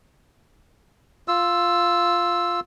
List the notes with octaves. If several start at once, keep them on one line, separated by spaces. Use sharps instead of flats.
F4 E6